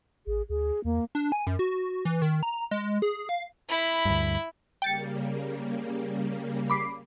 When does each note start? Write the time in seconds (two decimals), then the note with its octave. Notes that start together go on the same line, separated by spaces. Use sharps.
0.27 A1 G#4
0.49 D2 G#4
0.84 E2 A#3
1.15 D4
1.32 G#5
1.47 F#2
1.59 F#4
2.05 E3
2.22 D#3
2.43 A#5
2.71 G#3
3.02 G#4
3.29 F5
3.69 E4 B5
4.05 D2 G2
4.82 C#3 G3 A#3 G5 A6 C#7
6.70 B5 D6 C7